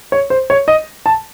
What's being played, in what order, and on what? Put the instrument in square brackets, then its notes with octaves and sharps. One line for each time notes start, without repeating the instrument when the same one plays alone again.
[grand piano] C#5
C5
C#5
D#5
A5